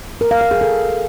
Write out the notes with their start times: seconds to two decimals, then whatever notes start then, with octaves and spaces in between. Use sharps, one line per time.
0.21 A#4
0.31 F5
0.41 F5
0.51 G#4
0.61 A4